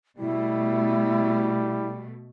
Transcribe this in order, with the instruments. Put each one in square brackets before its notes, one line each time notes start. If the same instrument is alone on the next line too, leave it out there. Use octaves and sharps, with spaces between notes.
[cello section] B2 A3 [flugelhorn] G3 [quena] E4